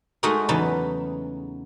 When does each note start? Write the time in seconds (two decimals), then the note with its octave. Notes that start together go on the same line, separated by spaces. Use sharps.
0.23 G#3 A3 D#4 F#4 G#4 A#4
0.49 E2 C#3 F#3 D#4 B4 A5